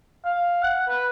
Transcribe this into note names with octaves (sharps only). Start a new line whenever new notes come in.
F5
F#5
B4